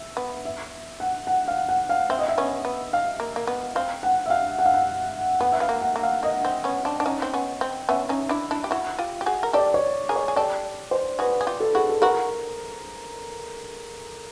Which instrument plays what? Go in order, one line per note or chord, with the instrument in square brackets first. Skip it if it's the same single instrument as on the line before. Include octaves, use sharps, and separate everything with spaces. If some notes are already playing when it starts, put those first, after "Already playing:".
Already playing: [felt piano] E5
[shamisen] B3
[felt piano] E5
F#5
F#5
F5
F#5
F5
[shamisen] C4 [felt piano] E5
[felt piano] D#5
E5
[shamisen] B3 C#4
B3
[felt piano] F5
[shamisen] A#3
A#3
B3
[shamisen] C4 [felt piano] F5
[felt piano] F#5
E5
F5
F#5
F5
F#5
[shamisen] B3 [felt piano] F#5
[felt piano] E5
[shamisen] B3 [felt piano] F5
[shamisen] A#3
[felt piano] F#5
[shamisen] A#3
[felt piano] F5
[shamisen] A#3 [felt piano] D#5
[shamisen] C4
B3 C#4
C4 D4
D4
C#4 D#4
C4
B3 C#4
C4
[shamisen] B3 C#4 [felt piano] E5
[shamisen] C#4 D#4
D4 E4
D4 E4
G4
E4 F#4
F4 G4
G4
F#4 G#4
A#4
[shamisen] G4 A4 [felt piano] D5
[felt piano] C#5
[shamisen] G#4 A#4
[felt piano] C#5
[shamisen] G#4
[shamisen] G4 A4 [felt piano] D5
[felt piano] C5
[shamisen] F#4 G#4 [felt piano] B4
[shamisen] G#4
F4 G4
[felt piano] A4
[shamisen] E4 F#4 [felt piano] G#4
[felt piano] A4
[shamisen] E4 F#4 [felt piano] A#4